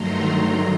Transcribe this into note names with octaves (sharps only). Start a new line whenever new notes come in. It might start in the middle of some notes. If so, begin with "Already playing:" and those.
Already playing: G2 D#3 F#3 A3 A#5 C6